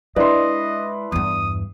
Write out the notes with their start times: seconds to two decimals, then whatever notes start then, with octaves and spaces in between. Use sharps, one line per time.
0.16 G#3 D4 E4 B4 D5 D#5 C6
1.12 E2 G2 D#6